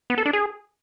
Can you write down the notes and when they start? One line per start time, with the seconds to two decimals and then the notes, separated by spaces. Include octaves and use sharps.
0.10 B3
0.18 A4
0.25 D4
0.33 G#4